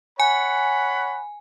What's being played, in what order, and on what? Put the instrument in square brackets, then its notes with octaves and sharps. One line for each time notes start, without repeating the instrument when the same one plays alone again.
[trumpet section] C#5 F#5 B5 [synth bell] G#5